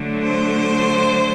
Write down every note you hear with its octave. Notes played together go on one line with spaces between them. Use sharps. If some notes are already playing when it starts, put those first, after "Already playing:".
Already playing: D3 F#3 A3
C5